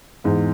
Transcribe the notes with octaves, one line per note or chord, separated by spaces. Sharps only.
E2 G#2